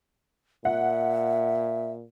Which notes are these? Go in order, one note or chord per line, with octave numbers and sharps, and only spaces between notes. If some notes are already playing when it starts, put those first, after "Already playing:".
A#2 E5 F#5